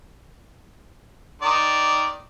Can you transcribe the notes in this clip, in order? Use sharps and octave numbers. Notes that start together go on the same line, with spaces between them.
D#3 D5